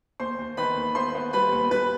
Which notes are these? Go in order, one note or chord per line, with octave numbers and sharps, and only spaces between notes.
D#2 C5 C6
D#2
D#3 B4 B5
D#2
B3 C5 C6
B3
G3 B4 B5
D#2
G3 B4 B5